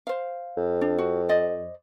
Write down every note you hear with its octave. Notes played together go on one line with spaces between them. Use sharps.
C5 F5
F2
D4
F#4
C5 D5 D#5